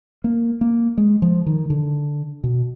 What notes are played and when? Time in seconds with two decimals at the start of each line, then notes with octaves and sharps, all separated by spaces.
0.24 A#3
0.61 A#3
0.98 G#3
1.22 F3
1.46 D#3
1.70 D3
2.44 B2